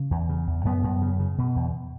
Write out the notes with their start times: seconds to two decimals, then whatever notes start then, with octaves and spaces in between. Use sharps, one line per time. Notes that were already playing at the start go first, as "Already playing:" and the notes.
Already playing: C#3
0.11 E2
0.29 C#3
0.47 E2
0.65 F#2 B3
0.84 F#2
1.02 C#3
1.20 C#3
1.38 B2
1.56 E2